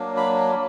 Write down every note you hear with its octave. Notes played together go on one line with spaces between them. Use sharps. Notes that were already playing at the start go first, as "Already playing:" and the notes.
Already playing: F#3 A#3 D4
B5